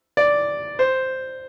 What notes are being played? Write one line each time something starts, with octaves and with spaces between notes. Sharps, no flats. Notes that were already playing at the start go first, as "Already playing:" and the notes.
D5
C5